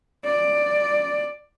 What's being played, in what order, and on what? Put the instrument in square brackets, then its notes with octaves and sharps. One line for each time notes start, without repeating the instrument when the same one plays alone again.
[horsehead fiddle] D5